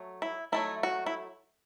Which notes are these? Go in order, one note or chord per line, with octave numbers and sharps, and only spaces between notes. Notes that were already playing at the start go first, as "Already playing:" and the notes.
Already playing: F#3 A3
E4
F#3 A3 D#4 E4
F#4
E4